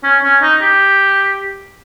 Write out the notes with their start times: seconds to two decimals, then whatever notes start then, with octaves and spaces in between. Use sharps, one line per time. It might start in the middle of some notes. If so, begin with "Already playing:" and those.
0.03 C#4
0.23 C#4
0.42 D#4
0.62 G4